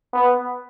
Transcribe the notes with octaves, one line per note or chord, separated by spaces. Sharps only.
B3